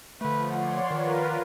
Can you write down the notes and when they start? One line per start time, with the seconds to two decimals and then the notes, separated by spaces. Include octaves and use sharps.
0.21 D3 F3 A3 B4
0.53 C#5 D5 F#5 C6
0.91 D#3 F4 A#4 B4